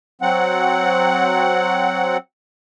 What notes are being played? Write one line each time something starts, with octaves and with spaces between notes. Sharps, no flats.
F#3 C4 F#5